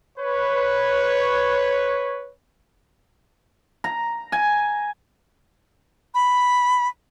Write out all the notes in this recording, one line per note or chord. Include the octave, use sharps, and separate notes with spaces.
B4 C#5
A#5
G#5
B5